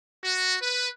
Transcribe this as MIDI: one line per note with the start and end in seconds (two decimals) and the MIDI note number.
0.23 0.55 66
0.60 0.89 71